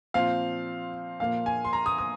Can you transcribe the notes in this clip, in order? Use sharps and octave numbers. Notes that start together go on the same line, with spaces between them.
A#2 F3 C4 F5
A#2 F3 A#3 F5
G#5
C6
A#5
D#6
D#6